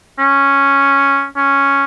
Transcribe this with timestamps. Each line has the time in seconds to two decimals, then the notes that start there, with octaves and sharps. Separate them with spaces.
0.19 C#4
1.37 C#4